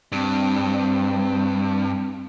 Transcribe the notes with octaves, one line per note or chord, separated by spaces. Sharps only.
G2 C4